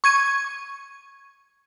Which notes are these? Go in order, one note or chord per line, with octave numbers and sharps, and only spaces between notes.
C#6 G#6 D#7